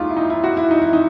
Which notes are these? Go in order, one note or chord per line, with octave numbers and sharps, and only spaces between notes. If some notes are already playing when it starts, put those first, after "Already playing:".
Already playing: D#2 D#3 G#3 F4
E4
D#4
E4
F#4
E4
D#4
E4
D#4